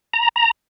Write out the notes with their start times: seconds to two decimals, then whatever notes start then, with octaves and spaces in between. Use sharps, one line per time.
0.13 A#5
0.36 A#5